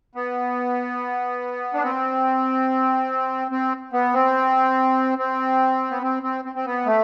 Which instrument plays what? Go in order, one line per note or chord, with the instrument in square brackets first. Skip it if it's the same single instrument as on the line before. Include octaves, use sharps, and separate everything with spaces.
[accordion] B3
D4
C4
C4
B3
C4
C4
B3
C4
C4
C4
C4
B3
A3